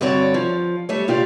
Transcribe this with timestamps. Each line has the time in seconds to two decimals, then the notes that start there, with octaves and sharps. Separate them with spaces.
0.01 G2 D3 C4 F#4 C#5 D5
0.34 F3
0.89 G3 A3 C#5
1.08 A#2 F4 G4 D5